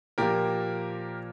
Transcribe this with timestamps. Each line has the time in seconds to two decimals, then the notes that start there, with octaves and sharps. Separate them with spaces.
0.18 A#2 F3 A#3 G4 A#4